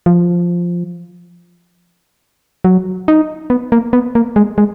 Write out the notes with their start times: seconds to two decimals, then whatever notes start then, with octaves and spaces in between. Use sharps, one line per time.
0.06 F3
2.64 F#3
3.08 D#4
3.50 B3
3.72 A#3
3.93 B3
4.15 A#3
4.36 G#3
4.58 G#3